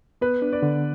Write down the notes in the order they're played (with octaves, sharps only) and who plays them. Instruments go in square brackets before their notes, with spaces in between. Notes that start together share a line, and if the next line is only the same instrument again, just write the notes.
[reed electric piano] B3 [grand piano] B4
[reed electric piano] D4
[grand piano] D5
[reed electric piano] D3